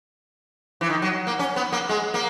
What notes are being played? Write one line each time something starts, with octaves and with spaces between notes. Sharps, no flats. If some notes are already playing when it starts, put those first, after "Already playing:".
E3
D#3
F#3
A#3
C#4
B3
A#3
G#3
A#3